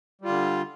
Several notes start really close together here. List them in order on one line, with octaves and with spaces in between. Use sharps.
G3 F4 D3